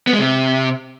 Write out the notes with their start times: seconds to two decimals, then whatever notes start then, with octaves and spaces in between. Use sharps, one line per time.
0.07 B3
0.13 G#3
0.19 C3